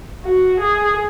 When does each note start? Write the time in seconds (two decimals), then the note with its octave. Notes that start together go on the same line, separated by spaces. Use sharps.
0.24 F#4
0.60 G#4